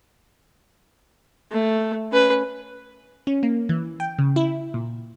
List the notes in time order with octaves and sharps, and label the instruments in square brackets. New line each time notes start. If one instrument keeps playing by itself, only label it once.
[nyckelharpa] A3
C#4 B4
[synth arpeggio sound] C#4
A#3
E3
G5
C#3
E4
A#2